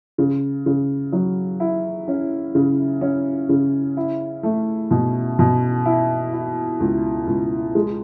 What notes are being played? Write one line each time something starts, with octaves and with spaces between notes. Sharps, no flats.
C#3
C#3
F#3
E4
C#4
C#3
C#4
C#3
E4
A3
B2
B2
E4
E4
C#2
C#2
G#3